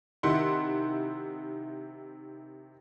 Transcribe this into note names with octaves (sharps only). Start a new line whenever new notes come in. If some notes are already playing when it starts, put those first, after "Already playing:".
C3 D#3 E4 F#5 C6